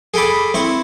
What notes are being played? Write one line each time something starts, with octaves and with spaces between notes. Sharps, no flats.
G#4 A4 G5 B5 D6
C4 E4 C#6